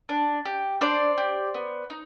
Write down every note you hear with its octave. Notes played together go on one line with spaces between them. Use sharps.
D4
G4
D4 C5 D5
G4
B3
D#4